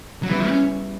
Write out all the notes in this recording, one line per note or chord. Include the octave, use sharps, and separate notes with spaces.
F#3
C#3 E3 G3 B3 E4
C#4